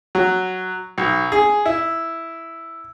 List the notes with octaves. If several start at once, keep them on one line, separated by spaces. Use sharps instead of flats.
F#3
B1
G#4
E4